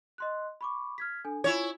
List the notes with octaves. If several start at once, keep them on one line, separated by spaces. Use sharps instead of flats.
D#5 C6 F#6
B5 C#6 D6
F6 G#6 B6
D4 A4 G#5
E4 F4 C#5 G#5